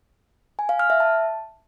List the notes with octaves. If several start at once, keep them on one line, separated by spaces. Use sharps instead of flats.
G#5
F5
F6
E5
A5